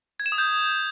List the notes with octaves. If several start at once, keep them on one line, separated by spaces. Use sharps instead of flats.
G#6
E7
D#6
G6